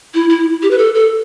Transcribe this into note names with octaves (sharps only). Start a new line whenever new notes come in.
E4
E4
G4
B4
A4
A4